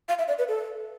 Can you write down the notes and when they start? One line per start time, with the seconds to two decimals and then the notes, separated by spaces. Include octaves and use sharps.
0.09 F5
0.19 E5
0.28 D5
0.39 B4
0.48 A4